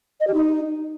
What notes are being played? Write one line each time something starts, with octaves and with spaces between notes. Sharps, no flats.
D#5
G4
D#4